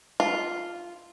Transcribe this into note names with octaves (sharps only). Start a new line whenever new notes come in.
F4